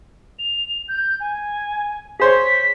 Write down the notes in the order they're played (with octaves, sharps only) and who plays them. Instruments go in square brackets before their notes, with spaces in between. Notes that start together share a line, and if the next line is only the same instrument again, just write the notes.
[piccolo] F7
G6
G#5
[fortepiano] G#4 C5 C#5 [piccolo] B6